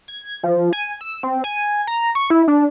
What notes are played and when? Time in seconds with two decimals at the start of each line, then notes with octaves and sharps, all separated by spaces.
0.08 G#6
0.43 F3
0.73 G#5
1.01 E6
1.23 C4
1.44 G#5
1.87 A#5
2.15 C#6
2.30 E4
2.48 D4